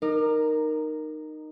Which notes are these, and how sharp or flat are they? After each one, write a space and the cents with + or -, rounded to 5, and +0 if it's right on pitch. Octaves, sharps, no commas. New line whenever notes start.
D#4 -15 A#4 +0 D6 +35